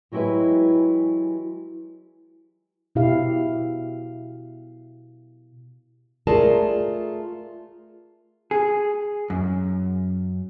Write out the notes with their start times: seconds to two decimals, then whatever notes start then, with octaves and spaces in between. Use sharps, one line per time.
0.12 E3 F#3 G#3 E4 G4 B4
2.95 B2 E4 G4 F5
6.27 A3 F4 G#4 A#4 D5 A5
8.51 G#4
9.30 F#2